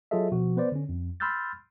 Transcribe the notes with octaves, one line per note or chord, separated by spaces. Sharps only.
F#3 F4 G#4 A4 D#5 E5
B2 F3 F#4
B3 B4 C5 D5
D3 C#4
F2
B5 C6 E6 F6 G6 A6